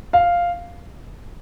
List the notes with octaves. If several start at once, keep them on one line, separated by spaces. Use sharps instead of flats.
F5